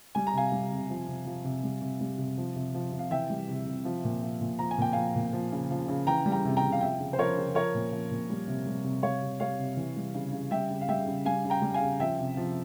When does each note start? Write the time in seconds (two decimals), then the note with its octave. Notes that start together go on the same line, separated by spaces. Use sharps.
0.15 G3 G#5
0.27 A#5
0.33 C3 F5 G#5
0.52 G3
0.71 C3
0.90 F3
1.08 C3
1.26 F3
1.45 C3
1.63 G3
1.82 C3
2.01 G3
2.18 C3
2.38 F3
2.56 C3
2.75 F3
2.92 C3
2.99 F5
3.11 E3 E5 G5
3.30 G3
3.48 C3
3.66 C3
3.85 F3
4.04 A#2
4.23 F3
4.41 A#2
4.59 F3 A#5
4.71 G#5
4.78 A#2 G5
4.93 F3 F5 G#5
5.15 A#2
5.33 F3
5.52 C#3
5.71 F3
5.88 C#3
6.07 E3 G5 A#5
6.26 G3
6.32 G5 A#5
6.45 C3
6.57 G5 A#5
6.62 C3
6.72 F5
6.81 F3 E5 G5
7.00 C#3
7.13 C5
7.19 F3 A#4 C#5
7.37 C#3
7.55 F3 A#4 C#5
7.74 A#2
7.92 F3
8.11 A#2
8.30 G3
8.48 C3
8.67 G3
8.84 C3
9.03 G3 C#5 F5
9.22 C3
9.40 G3 C#5 F5
9.59 C3
9.77 E3
9.97 G3
10.14 C#3
10.33 C#3
10.51 G3 E5 G5
10.70 C#3
10.81 F5
10.89 G3 E5 G5
11.07 C#3
11.25 G3 F5 G#5
11.45 C#3
11.50 G5 A#5
11.62 G3
11.74 F5 G#5
11.81 C#3
12.00 F3 E5 G5
12.19 C3
12.37 F3